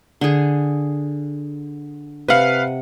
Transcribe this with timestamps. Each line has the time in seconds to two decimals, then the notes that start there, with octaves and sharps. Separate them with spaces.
0.21 D3 G#4
2.28 C3 B4 F5 F#5